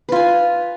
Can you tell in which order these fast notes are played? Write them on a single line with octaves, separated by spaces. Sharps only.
B4 F4 G#5